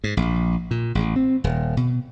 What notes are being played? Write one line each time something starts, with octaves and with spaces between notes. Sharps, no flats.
G#2
A#1
A#2
A1
C4
D#1
B2